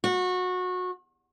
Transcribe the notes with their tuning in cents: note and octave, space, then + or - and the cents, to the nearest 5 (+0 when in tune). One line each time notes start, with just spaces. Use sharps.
F#4 -25